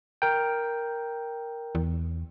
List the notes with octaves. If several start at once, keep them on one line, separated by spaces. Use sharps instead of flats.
A#4 G5
E2